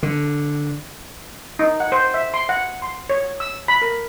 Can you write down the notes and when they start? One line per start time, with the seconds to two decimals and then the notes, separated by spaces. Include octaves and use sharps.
0.03 D3
1.59 D#4
1.80 F#5
1.92 C5
2.14 E5
2.34 C6
2.49 F#5
2.82 C6
3.09 C#5
3.40 E6
3.68 B5
3.82 A#4